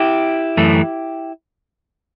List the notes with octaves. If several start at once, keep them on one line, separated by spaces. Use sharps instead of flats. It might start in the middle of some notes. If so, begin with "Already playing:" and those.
Already playing: E4 G4
F#2 E3 A3